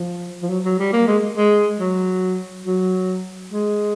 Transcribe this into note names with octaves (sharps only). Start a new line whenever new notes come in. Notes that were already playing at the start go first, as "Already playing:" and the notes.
Already playing: F3
F3
F#3
F#3
G3
A#3
G#3
G#3
F#3
F#3
G#3